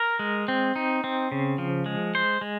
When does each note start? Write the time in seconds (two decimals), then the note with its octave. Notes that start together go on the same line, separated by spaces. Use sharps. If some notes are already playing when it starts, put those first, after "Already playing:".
Already playing: A#4
0.19 G#3
0.48 C4
0.76 D#4
1.04 C4
1.32 C#3
1.58 F3
1.86 G#3
2.15 C5
2.41 G#3